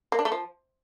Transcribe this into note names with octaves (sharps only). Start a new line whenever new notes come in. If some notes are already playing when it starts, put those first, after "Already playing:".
A#3
D4
A3
F3